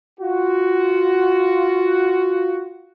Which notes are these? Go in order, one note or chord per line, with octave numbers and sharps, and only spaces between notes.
F4 F#4